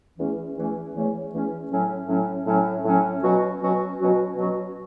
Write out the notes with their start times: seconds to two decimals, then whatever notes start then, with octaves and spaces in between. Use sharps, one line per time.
0.19 E2 E3 A3 C#4
0.57 E2 E3 A3 C#4
0.95 E2 E3 A3 C#4
1.33 E2 E3 A3 C#4
1.71 A2 F#3 C#4
2.08 A2 F#3 C#4
2.46 A2 F#3 C#4
2.84 A2 F#3 C#4
3.23 B2 F#3 C#4 F#4
3.61 B2 F#3 C#4 F#4
3.99 B2 F#3 C#4 F#4
4.37 B2 F#3 C#4 F#4